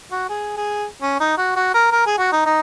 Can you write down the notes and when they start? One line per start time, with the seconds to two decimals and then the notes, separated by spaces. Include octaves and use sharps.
0.12 F#4
0.30 G#4
0.57 G#4
1.02 C#4
1.20 D#4
1.38 F#4
1.56 F#4
1.74 A#4
1.92 A#4
2.06 G#4
2.19 F#4
2.33 D#4
2.46 D#4